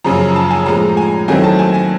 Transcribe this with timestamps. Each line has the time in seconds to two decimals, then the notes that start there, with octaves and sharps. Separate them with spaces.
0.04 F#2 C#3 F3 A#5
0.36 A5
0.51 G#5
0.66 A2 F3 G#3 A#5
0.97 G#5
1.28 D#3 F#3 A3 C4 E4 G#5
1.44 A5
1.59 G#5
1.74 G#5